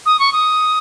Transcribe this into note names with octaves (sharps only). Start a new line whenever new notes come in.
D#6
C#6
D#6